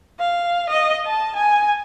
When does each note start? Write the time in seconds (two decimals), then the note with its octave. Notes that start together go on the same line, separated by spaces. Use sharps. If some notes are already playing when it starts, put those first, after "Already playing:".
0.19 F5
0.70 D#5
1.07 A5
1.36 G#5